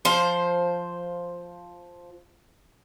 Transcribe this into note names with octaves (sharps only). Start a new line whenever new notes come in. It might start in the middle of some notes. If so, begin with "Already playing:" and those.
F3 C5